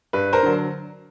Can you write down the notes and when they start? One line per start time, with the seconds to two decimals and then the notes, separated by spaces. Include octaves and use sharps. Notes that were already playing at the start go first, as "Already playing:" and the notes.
0.13 G2 B4
0.33 A#4 C5
0.43 D3 F#3